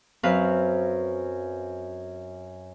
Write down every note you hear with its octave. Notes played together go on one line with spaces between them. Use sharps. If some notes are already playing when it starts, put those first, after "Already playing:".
F#2 C4 B4 F5 F#6